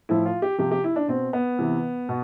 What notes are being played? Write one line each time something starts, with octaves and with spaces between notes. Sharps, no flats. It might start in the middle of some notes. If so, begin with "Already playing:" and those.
A2 F3 E4
F4
G4
C3 F3 G4
G4
E4
D4
B2 C4
B3
C3 E3
B2